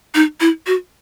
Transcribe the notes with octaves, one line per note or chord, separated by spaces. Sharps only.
D#4
E4
F#4